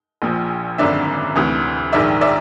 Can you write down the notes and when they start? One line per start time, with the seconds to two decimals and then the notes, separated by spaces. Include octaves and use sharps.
0.22 A#1 A#2 F3
0.78 G#1 F#2 D3 D5 E5
1.35 D2 C3 E3
1.93 A#1 G#2 D#3 D5 E5
2.21 D5 E5